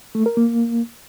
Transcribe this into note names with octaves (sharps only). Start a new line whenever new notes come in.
A3
A#4
A#3